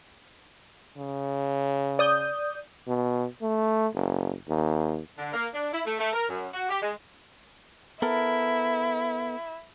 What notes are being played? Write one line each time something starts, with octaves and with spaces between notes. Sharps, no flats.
C#3
D5 D#6 G6
B2
A3
F#1
D#2
D3
A#3
D4
E4
A3
A3
A#4
F#2
F#4
G4
G#3
B3 E4 A4 A#4